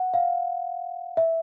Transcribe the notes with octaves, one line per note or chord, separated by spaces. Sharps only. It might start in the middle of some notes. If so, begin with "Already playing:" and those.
Already playing: F#5
F5
E5